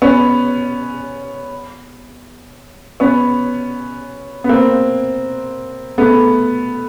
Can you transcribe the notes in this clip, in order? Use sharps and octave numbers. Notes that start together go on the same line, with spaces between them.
B3 C#4
B3 C#4
B3
A#3 C4
A3 B3